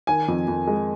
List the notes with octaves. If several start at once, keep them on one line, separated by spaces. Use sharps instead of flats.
D#3 G#5
F2
F2
G#3